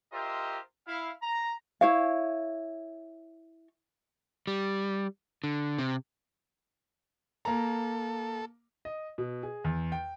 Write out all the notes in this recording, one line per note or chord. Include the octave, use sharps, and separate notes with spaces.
F4 G4 A#4 C5 D#5 E5
E4 F5
A#5
E4 C#5 F5
G3
D3
C3
A#3 A4 A#5
D#5
B2
G#4
E2
G5